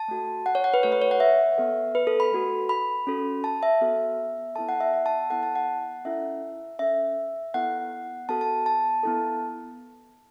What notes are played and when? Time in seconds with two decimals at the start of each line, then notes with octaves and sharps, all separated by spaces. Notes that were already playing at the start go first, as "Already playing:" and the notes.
Already playing: A5
0.08 A3 F#4 A4
0.46 F#5
0.55 C#5
0.64 F#5
0.74 B4
0.83 A3 F#4 A4 C#5
0.92 B4
1.02 C#5
1.11 F#5
1.20 E5
1.58 B3 A4
1.95 B4
2.07 A4
2.20 B5
2.32 A3 F#4 A4
2.69 B5
3.07 C#4 F#4 A4
3.44 A5
3.63 E5
3.81 B3 F#4 A4
4.56 B3 E4 A4 A5
4.69 F#5
4.80 E5
4.93 F#5
5.06 A5
5.30 B3 E4 A4 F#5
5.43 A5
5.55 F#5
6.05 C#4 E4 A4 E5
6.79 C#4 A4 E5
7.54 B3 E4 A4 F#5
8.29 B3 F#4 A4 A5
8.41 A5
8.66 A5
9.03 B3 E4 A4